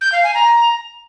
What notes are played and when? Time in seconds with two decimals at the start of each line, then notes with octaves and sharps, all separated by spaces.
0.01 G6
0.12 F5
0.23 G#5
0.34 A#5